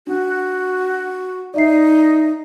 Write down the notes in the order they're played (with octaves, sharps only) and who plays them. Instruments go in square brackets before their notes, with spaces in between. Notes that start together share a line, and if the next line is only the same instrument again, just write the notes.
[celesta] D4 [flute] F#4
[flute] D#4 [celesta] D5 E5 C7